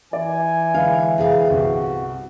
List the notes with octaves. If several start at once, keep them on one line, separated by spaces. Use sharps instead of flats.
E3 D5 G#5
D3 G#3 B4 F5
C3 G#4 F5
G1 C2 F#4